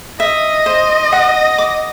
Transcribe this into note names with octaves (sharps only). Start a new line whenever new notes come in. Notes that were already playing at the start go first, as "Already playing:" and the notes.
D#5 E5
C5
F#5
D6